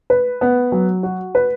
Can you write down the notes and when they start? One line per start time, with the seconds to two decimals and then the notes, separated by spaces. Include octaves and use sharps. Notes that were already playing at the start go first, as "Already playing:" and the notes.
0.10 B4
0.41 B3
0.72 F#3
1.03 F#4
1.35 B4